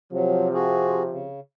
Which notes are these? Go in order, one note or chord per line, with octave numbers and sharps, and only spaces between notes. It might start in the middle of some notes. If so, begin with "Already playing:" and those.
C3 F3 F#3
F#4 G#4
C#3